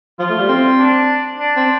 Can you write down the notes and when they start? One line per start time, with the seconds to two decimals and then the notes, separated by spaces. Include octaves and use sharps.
0.19 F3 F4
0.29 A3
0.39 G3
0.49 C4
0.78 D4
1.39 D4
1.56 C4